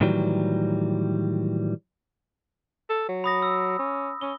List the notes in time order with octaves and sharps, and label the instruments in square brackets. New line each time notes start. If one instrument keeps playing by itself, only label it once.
[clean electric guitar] A2 D#3 E3 F#3 G3
[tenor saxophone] A4
F#3
[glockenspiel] B5 D#6 A#6
E6
[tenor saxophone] C#4
[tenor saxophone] C#4 [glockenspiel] G7